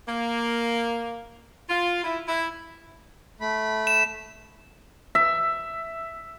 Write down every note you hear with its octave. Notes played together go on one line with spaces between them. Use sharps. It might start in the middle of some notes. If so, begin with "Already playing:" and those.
A#3
F4
E4
E4
A3 B5
E7
E5